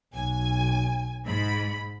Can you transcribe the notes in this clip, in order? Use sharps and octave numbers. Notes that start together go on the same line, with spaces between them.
B1 G#5
G#2 B5